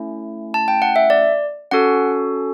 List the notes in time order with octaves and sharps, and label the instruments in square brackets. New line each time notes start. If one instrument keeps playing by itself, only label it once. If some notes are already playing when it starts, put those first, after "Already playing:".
Already playing: [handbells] A3 C#4 E4
A5
G5
F#5
E5
D5
C#4 F#4 A4 F#5